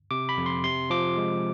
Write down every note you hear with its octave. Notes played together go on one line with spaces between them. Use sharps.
C3 D6
B5
F2
C6
C3 C6
F3 D6
G#3